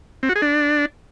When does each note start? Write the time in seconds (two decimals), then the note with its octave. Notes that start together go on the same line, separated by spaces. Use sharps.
0.23 C4
0.29 F#4
0.36 G#4
0.42 D4